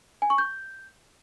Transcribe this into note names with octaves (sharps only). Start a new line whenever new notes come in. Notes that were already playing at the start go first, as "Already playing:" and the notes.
G#5
C#6
G6